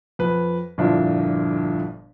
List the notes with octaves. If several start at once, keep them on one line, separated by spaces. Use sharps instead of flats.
F2 B4
G1 F2 A#2 F3 D4 E4